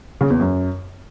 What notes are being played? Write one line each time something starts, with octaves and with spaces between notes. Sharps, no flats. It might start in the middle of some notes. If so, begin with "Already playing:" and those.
C#3
E2
F#2